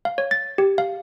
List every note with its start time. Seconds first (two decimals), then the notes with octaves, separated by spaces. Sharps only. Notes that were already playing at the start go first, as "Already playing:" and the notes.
0.05 F5
0.18 C#5
0.31 A6
0.58 G4
0.78 F5